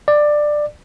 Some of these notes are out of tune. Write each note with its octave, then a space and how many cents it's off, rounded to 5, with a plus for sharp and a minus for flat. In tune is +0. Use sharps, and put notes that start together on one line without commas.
D5 +15